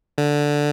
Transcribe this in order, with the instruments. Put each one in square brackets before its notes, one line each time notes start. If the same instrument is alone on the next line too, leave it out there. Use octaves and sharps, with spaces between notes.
[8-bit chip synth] D3